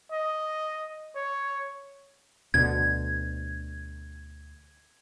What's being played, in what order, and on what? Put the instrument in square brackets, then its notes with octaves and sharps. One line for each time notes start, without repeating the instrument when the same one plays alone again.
[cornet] D#5
C#5
[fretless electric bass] D2 B2 D3 [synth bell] G#6